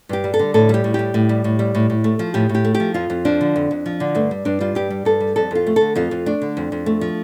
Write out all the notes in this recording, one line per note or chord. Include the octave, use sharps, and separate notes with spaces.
G2 G4
G3
A4
D3
A2 A4
G3 G4
A2
G3 G4
A2
G3
A2
G3
A2
A2
A3
F3
A2 G4
A2
G4
A3
G4
F3
F2 F4
F2
F3 D4
D3
F2
F2
F3
D3
G2 A3
G3
G2 D4
G3 F4
G2 G4
G3
G2 A4
G3
F2 A4
F2 F4
A3
D3 A4
F2 F4
F2
A3 D4
D3
F2
F2
A3
F3